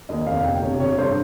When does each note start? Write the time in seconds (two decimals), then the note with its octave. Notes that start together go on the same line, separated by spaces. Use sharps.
0.09 D#2 D#5
0.27 F1 F5
0.44 G1 G5
0.62 C3 C#5
0.80 C3 C#5
0.98 G2 C5